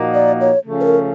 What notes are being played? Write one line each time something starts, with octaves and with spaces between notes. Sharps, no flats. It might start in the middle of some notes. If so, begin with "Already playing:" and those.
Already playing: A#2 F3 A#3 D#4 F#4
D5
C#5
C#3 F3 A3 C#4
B4
A#4